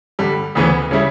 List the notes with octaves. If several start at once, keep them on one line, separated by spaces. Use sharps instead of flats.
G2 D3 G3
D2 C#3 E3 B3
C#3 G3 C#4 E4